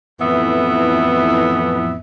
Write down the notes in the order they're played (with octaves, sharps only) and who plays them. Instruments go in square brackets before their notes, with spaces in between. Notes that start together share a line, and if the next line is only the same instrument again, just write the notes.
[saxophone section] F2 A2 E3 B3 E5